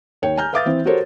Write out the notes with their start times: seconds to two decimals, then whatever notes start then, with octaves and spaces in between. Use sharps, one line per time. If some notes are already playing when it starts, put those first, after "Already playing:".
0.22 D#2 C#5 G5
0.37 G#5 A#5 F6 G6
0.53 B4 E5 F5 D6 D#6 A6
0.66 E3 C4 E4
0.85 F#4 G4 A4 A#4 C5 C#5